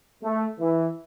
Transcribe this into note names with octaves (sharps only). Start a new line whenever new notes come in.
A3
E3